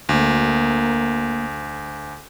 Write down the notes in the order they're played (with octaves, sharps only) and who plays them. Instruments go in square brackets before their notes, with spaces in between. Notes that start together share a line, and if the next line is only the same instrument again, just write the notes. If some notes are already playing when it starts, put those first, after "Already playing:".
[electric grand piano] D2 [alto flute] A#3